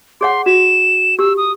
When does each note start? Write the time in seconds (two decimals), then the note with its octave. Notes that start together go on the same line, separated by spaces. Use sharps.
0.21 G#4 C#5 F#5 C6
0.46 F#4 E7
1.19 G4 E6
1.37 D#6